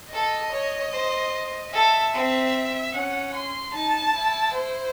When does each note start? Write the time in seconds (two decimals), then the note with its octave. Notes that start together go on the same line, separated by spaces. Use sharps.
0.12 A4 D#5
0.52 C#5
0.93 C5
1.72 A4 E5
2.13 C4
2.93 C#4 F#5
3.33 C6
3.73 D#4 A5
4.13 E4
4.54 C5